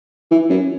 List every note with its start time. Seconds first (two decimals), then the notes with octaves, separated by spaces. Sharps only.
0.31 E3
0.50 F#2